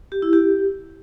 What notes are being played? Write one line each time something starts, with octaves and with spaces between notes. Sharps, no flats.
G4
E4
G4